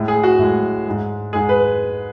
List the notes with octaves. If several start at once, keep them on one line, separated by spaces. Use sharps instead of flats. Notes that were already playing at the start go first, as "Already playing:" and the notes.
Already playing: A2 G#3
G#4
F#4
A2 G#3
G#2 G#3
G#2 G#3 G#4
B4